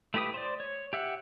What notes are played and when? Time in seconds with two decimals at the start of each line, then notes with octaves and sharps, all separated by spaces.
0.14 A3 E4 G4 B4 D#6
0.34 C5 D5
0.60 C#5
0.93 G4 E5 F#5